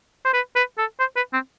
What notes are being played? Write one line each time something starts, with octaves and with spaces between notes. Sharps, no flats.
C5
B4
B4
A4
C5
B4
C4